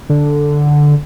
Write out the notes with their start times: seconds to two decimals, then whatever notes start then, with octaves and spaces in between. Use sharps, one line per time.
0.09 D3